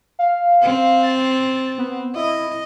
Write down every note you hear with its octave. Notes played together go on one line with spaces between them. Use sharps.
F5
C4
A6
B3
E4 D#5